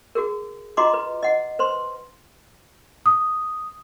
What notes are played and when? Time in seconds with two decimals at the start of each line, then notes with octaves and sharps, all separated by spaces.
0.15 F#4 G#4 A#4
0.77 F4 F#4 D#5 A#5 C6 D6
0.94 B4
1.23 D#5 F#5
1.59 B4 C5 C6
3.06 D#6